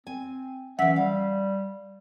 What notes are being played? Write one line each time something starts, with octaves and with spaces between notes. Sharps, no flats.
C4 G#5
E3 C#4 E5 F#5
G3 F5